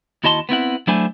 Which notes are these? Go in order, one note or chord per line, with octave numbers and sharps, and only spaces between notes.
D#2 E4 F#4 D#5 A5 C6
B3 C4 E4 F#5
F#3 A3 D4 E4 C5 G#5